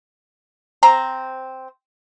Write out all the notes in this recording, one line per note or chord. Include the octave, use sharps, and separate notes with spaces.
C4 C5 A#5